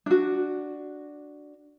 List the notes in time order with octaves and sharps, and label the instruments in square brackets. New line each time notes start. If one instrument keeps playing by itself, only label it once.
[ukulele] D4 F#4